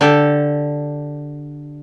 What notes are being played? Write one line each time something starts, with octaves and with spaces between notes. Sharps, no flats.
D3 G4 A4